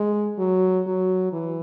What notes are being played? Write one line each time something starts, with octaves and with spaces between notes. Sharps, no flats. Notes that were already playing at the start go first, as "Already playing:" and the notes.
Already playing: G#3
F#3
F#3
E3